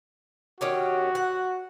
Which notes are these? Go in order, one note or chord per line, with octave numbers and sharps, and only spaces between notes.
D#3 C#4 F#4 G4
F#5